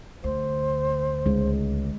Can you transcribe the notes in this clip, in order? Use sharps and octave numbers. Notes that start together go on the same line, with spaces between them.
D2 C5
C#2 G#3